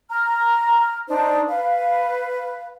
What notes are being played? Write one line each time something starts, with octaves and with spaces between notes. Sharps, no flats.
A#5 F6
D4 D#4 C5
B4 F5